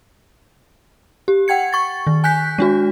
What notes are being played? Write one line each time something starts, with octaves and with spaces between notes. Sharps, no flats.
G4
F#5 G5 G#6 C#7
C#6 A6
D#3
G#5 F#6 G6 B6
G#3 D4 F#4